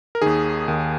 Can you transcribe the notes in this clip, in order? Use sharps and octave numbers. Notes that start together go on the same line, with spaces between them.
A#4
D#2 D#3 G#4
D#2 D#3